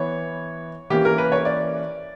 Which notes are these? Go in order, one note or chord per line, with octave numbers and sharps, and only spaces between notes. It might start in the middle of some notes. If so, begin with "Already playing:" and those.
Already playing: E3 B3 C#5
E3 A#3 C#4 G4
A#4
B4
C#5
D5